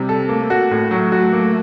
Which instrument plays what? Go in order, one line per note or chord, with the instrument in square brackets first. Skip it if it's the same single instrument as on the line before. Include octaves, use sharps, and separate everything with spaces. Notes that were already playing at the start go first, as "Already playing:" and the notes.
Already playing: [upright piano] C3 [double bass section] G3
[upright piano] A4
[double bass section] A3 [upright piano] A#3
[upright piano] F#4
A2
F#3
F#4
A#3